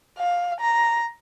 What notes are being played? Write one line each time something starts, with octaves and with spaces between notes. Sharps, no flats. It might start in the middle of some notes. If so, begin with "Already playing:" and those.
F5
A#5